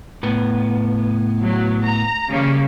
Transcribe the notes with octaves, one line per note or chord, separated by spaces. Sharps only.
A2 B3
F#3
A#5
C#3 G3 A#3